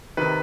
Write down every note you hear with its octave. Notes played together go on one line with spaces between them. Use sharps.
C3 D#3 B4